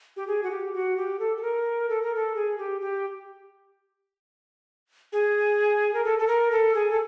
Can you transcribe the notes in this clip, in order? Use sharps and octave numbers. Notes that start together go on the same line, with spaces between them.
G4
G#4
F#4
G4
F#4
G4
A4
A4
A#4
A4
A#4
A4
G#4
G4
G4
G#4
A#4
A4
A4
A#4
A4
G#4
A4